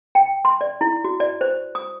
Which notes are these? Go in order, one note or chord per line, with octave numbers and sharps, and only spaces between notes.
G5
C6
D5
E4
F#4
D5
C5
D#6